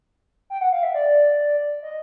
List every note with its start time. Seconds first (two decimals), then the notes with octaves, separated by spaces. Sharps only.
0.50 G5
0.61 F#5
0.72 F5
0.83 E5
0.94 D5
1.83 D#5